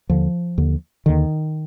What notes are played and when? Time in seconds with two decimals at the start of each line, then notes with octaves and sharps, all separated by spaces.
0.09 D#2 D3 F3
0.58 D#2 D3
1.06 D#2 D3 D#3